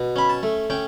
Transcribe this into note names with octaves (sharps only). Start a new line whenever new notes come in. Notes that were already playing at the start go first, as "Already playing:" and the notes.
Already playing: B2
C#4 B5
A5
A3
C#4 G5